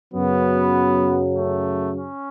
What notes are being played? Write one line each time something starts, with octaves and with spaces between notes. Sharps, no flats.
F#2 C#3 F#3 B3
A3
C#4